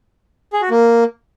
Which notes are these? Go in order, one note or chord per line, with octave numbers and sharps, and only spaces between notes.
G#4
F#4
A#3